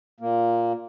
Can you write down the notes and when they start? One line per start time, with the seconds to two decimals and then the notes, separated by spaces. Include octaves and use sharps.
0.20 A#2 A#3